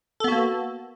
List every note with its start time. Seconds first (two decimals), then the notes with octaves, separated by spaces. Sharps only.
0.20 A4
0.24 B3
0.28 F#4
0.32 A#3